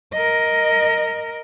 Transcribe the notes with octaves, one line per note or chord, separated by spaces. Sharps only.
A#4 D#5